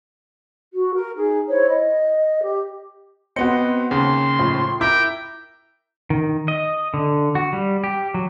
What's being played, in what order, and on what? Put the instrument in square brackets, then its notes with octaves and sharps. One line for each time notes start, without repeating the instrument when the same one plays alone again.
[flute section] F#4
A#4
D#4 G#4
E4 C5 C#5
D#5
G4
[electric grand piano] B3 C#7 [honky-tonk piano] C4 F#4 [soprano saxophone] D#5
[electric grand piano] D#2 C#3 [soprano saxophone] C6
[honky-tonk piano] A2 F3
[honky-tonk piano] E4 [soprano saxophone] A#4 [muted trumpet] G5 [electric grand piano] D6
[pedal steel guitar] D#3
D#5
D3
F#4
G3
G4
F#3